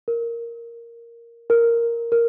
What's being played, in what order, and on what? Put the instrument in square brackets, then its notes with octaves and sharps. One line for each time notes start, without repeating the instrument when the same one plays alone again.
[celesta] A#4
A#4
A#4